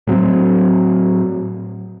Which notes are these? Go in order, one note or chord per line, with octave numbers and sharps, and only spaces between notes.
A2 F#3 C4